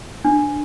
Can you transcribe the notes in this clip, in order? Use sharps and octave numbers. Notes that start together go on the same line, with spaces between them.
D4